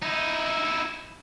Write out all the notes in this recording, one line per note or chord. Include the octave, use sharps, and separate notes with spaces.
D#4 E4